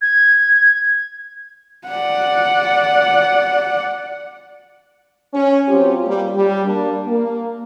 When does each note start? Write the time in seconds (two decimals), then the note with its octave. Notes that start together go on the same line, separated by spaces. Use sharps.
0.02 G#6
1.88 D5 F#5
5.34 C#4
5.68 F#3 C4 F4 G4
6.05 G3 A#3
6.36 G3
6.65 G3 A#3 D4
7.07 A#3